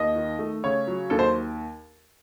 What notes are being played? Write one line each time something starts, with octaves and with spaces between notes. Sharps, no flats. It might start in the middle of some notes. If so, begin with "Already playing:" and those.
Already playing: D#2 D#5
D#3
A3
C#3 C#5
F#3
D#2 A4
C5